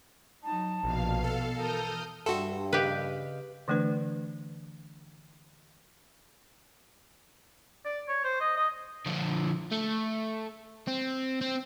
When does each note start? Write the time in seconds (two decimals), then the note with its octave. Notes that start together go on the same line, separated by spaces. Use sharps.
0.44 F#3 D#4 A5
0.83 A#1 B2 F3 F5
1.24 A4
1.57 E3 A#4 A5 D#6 F6 G6
2.26 G2 F#4 A4 E5 G5 C6
2.73 C#3 G4 B4 D#5 F5
3.68 D3 E3 A3 D4 B4
7.85 D5
8.08 C#5
8.24 C5
8.40 D#5
8.57 D#5
9.06 D3 F3
9.71 A3
10.87 C4
11.41 C4